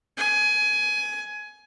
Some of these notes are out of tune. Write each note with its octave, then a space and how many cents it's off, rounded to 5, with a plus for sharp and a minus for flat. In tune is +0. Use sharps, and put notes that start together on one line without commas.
G#5 +20